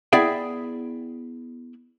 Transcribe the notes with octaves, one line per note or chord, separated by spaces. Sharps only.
B3 E4 G#4 D5 E5 G5